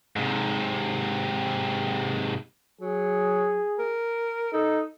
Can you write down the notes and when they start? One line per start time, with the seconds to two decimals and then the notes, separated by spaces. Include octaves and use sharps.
0.16 G#2 C3
2.81 F#3 G#4
3.79 A#4
4.53 D#4 A4